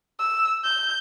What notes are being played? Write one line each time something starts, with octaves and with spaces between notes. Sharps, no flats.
E6
G6